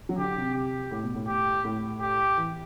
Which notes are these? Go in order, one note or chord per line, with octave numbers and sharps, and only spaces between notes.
F#3
D3 G4
C3
G4
A2
B2
A2
G4
A2
G4
E3